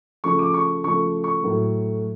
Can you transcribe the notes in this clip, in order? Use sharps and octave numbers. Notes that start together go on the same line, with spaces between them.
C#3 F3 A3 C#6
D6
C#6
C#3 F3 A3 C#6
C#6
A2 F#3 A3